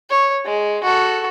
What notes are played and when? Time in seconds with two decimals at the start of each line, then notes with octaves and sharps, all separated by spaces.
0.10 C#5
0.45 G#3
0.84 F#4 A4